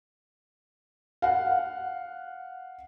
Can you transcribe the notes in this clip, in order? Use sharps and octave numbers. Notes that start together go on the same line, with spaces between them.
F5 F#5